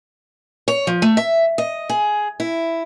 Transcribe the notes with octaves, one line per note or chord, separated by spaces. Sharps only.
C#5
F3
A3
E5
D#5
G#4
E4